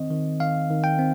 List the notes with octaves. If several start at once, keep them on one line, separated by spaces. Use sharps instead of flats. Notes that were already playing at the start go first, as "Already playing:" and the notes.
Already playing: D#3 C4 D#5
D#3
D#3 F5
D#3
G5
C4